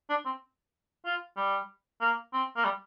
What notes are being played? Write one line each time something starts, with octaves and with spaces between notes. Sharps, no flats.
D4
C4
F4
G3
A#3
C4
A#3
G3